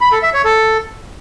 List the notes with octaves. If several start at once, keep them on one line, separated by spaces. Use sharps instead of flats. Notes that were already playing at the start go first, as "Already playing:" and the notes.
B5
A4
E5
C#5
A4